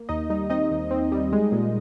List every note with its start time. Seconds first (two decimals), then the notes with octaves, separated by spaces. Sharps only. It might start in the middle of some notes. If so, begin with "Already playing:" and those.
Already playing: A#3
0.09 D#2 D#4 D#5
0.30 G3 D#4 D#5
0.50 C4 D#4 D#5
0.71 D#2
0.91 C4
1.12 G3
1.32 G#3
1.52 A#2